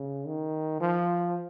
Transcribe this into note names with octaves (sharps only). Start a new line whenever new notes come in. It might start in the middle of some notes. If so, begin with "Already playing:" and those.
Already playing: C#3
D#3
F3